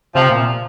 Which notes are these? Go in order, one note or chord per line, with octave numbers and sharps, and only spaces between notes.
C3 F3
A#2